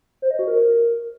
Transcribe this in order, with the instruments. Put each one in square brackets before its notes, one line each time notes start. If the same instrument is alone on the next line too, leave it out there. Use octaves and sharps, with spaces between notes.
[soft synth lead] C5
D#5
F#4
A#4